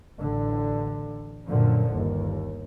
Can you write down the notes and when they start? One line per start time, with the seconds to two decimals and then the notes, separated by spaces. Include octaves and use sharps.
0.17 A1 D3
1.48 F#2 A#2 D3 F3
1.90 G1 D#2